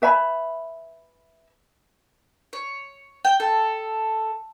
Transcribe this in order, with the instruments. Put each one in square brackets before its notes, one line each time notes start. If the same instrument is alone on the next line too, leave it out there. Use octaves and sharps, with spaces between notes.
[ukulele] B4 E5 G#5 B5
[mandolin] C#5
G5
A4